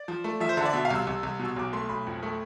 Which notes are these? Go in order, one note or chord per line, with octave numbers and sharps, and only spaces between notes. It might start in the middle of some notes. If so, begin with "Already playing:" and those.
Already playing: D5
F3
A3
F3 E5
C5
D3 E5
D5
B2 E5
F5
C2 E6
C2
C2
B2
E6
B1 D6
A3 C6
B1 B5
F2
A3